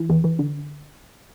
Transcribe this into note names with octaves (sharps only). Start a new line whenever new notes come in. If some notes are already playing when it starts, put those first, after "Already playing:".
Already playing: E3
E2
E3
D3